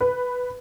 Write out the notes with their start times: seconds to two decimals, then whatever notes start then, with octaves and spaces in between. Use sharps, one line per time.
0.01 B4